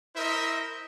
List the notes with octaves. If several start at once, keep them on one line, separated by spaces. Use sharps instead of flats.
E4 A#4 C5 D#5 E5